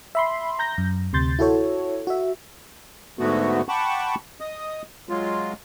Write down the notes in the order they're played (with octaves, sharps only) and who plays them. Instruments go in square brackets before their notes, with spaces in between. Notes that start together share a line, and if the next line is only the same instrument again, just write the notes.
[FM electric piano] E5 B5 C6
A#5 G6 A#6
F#2
D2 C3 C6 G6 A6
E4 F#4 A4 C#5
F#4 E5
[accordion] G#2 D3 A3 B3 F#4
F#5 G5 A5 B5 C#6 D6
D#5 D#6
F#3 G#3 F4